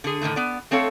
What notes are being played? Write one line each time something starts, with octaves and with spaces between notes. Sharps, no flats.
D3 G#4
A2 D3 D#3 A3
B3 D5
A3 C4 A4 C#5 F5